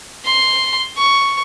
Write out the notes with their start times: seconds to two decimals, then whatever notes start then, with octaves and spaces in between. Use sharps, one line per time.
0.25 C6
0.97 C#6